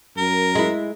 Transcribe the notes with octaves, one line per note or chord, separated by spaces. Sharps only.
F#2 A#4
G#3 E4